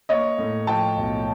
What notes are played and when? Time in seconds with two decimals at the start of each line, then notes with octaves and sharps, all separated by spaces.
0.09 A#3 C#5 D#5
0.38 A2
0.67 F3 G5 A5
0.97 B1